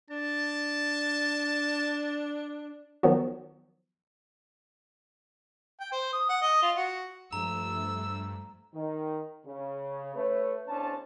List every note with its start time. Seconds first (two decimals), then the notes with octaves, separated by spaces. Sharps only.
0.10 D4 A5
3.03 D#3 F3 F#3 B3 F#4
5.80 G5
5.92 C5
6.13 D#6
6.29 F#5
6.41 D#5
6.62 F4
6.76 F#4
7.33 G2 F3 A3 A#5 E6
8.74 D#3
9.46 C#3
10.16 A3 B4 C#5
10.68 E2 C#4 D4 C5 A5